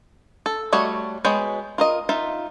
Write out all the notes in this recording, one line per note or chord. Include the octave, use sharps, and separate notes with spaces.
A4
G3 A3 F#4 C#5 D#5
G#3 B3 F#4 C#5 G5
F4 A#4 D#5
D#4 F4 E5